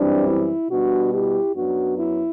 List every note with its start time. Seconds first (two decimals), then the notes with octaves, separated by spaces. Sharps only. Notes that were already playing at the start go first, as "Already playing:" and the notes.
Already playing: F#2 E3 G3 C4 D4
0.28 E4
0.70 B2 G3 B3 D4 F#4
1.13 E4 G4
1.56 F#2 F#3 B3 D4 F#4
1.98 E4